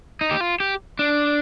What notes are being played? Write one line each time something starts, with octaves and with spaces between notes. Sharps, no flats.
D#4
G4
F4
G4
D4